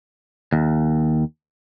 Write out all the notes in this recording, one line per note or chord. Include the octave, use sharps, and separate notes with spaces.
D#2